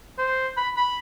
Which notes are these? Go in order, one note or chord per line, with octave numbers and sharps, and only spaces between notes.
C5
B5
B5